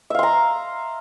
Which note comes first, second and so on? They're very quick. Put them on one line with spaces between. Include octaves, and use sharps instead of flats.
E5 F5 C6 A#5